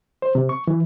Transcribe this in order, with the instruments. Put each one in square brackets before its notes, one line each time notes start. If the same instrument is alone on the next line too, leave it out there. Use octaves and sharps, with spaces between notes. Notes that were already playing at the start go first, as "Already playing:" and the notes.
[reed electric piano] C5
C3
C#6
E3